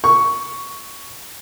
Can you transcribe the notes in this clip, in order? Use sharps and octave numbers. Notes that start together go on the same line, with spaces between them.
C#6